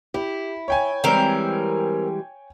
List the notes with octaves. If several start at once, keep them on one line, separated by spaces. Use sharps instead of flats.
E4 G4
C#5 G5 G#5
E3 G3 G#3 C4 A#4